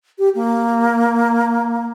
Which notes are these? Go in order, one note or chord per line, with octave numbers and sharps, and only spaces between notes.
G4
A#3